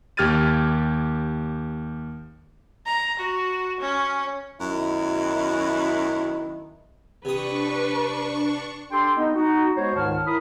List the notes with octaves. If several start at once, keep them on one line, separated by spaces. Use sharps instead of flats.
D#2 G4 F6 G#6 A6 D#7
A#5
F#4
C#4
F#2 B2 D#3 E4
C3 D4 B4 C#6 D#6
D4 G4 A4 G5 C6
B3 D#4
D#4 F#4
G#3 B3 F#4 C5 C#5
C#2 G#2 D#3 C#5 A5 F6
E4 A#4 B5 D#6